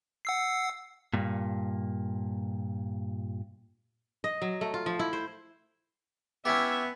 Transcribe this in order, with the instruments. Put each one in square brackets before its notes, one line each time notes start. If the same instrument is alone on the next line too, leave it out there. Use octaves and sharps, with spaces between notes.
[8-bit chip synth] F#5 E6 C7
[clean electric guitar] G2 A#2
[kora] D#5
F#3
A3
F4
F3
E4
C5
[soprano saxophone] B3 [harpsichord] C#4 E4 G4 [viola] E5